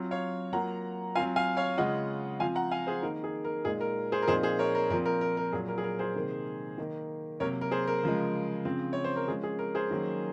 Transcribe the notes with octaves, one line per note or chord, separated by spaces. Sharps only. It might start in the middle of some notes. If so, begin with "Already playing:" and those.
Already playing: F#3 C4 F4
C#5 F5
F#3 A#3 F4 F#5 A#5
F#3 C4 F4 F5 G#5
F5 G#5
C#5 F5
C#3 G#3 C#4 F4 D#5 F#5
F3 C4 F4 F5 G#5
F#5 A#5
F5 G#5
G#4 C5
D#3 A#3 D#4 A#4
G#4
A#4
A#2 G#3 D#4 G#4
A#4
G#4 C5
A#4
A#2 F3 C4 D#4 G#4 C5
G#4 C5
A#4 C#5
A#4
A#2 F3 C4 A#4
A#4
A#4
A#4
A#2 F#3 A#3 G#4
A#4
G#4
A#4
G#4 C5
C3 D#3 A#3
D#3 A#3 D#4
C3 F#3 A#3 A#4 C#5
A#4
G#4 C5
A#4
C#3 F3 G#3
C#3 F3 C4
C#5
C5
A#4
F3 G#3 C#4 G#4
G#4
A#4
G#4 C5
D#3 F#3 A#3 C#4